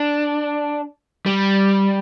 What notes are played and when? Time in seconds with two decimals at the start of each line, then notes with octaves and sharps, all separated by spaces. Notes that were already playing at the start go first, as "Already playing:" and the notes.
Already playing: D4
1.26 G3